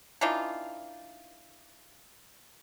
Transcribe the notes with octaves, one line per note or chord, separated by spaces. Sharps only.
E3 D4 D#4 F4